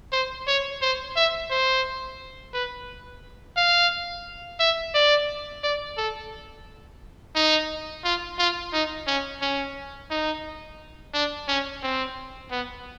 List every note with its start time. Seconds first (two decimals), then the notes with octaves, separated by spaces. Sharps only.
0.12 C5
0.47 C#5
0.82 C5
1.16 E5
1.51 C5
2.54 B4
3.57 F5
4.60 E5
4.94 D5
5.63 D5
5.97 A4
7.35 D#4
8.04 F4
8.38 F4
8.73 D#4
9.07 C#4
9.42 C#4
10.11 D#4
11.14 D4
11.48 C#4
11.83 C4
12.51 B3